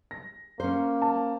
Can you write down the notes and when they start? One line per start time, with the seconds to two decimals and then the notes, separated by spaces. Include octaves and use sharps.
0.11 A#6
0.60 A#3 C#4 C5
1.02 A5